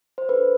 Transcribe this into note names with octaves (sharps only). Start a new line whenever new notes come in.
C5
D4 A4 B4